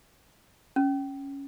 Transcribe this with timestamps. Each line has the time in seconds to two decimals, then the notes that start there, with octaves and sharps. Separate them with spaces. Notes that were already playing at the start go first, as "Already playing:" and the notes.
0.76 C#4